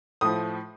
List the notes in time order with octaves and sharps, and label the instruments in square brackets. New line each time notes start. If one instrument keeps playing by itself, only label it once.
[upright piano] A2 F3 D#6